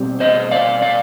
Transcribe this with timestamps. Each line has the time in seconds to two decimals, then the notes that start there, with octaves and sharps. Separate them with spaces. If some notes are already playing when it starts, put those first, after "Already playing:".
Already playing: B2 G3 C4
0.20 C5 D#5
0.51 D5 F5
0.82 D5 F5